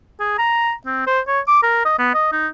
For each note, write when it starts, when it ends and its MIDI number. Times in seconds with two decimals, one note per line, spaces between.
0.20 0.35 68
0.38 0.72 82
0.86 1.04 60
1.07 1.20 72
1.27 1.40 73
1.48 1.61 86
1.63 1.80 70
1.85 1.96 75
1.99 2.10 59
2.14 2.29 75
2.32 2.48 63